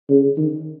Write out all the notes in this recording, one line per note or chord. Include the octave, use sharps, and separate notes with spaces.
C#3
D#3